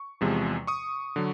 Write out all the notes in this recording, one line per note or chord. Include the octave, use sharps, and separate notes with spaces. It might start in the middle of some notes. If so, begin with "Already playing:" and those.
Already playing: C#6
E2 C3 F3 G#3
C#6 D#6
D3 F#3